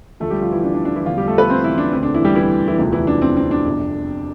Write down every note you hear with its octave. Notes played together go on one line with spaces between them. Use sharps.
D2 D3 F3 A3 A4
G3 G4
F3 F4
E3 E4
D4
D4
D4
E3 E4
E2 D3 F3 F4
G3 G4
A3 A4
B3 B4
C4 C5
E3 E4
D4
E1 D2 D3 C4
D4
E3 E4
G3 G4
E3 E4
E3 E4
E1 D2 C3 F3
E3 E4
D4
C4
C4
D4
G1 F2 C3